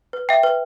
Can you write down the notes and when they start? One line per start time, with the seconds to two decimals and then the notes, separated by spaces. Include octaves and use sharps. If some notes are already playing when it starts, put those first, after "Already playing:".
0.13 B4
0.29 E5 G5
0.43 B4